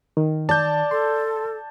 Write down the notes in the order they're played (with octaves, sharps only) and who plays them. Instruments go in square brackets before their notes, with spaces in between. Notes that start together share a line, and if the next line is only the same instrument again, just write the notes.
[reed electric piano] D#3
[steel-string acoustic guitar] D5 [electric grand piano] A5 G6
[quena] A4 [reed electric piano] C6